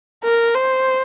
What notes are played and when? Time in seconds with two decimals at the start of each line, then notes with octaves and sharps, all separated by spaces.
0.24 A#4
0.54 C5